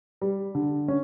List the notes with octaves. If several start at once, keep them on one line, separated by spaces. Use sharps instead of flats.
G3
D3
C#4